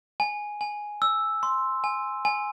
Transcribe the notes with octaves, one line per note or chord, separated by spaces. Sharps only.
G#5
G#5
E6
C6
G#5
G#5